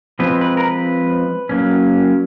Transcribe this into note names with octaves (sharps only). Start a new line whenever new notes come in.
F3 G#3 C4 B4
B4
A#4
B4
F#3 A#3 C#4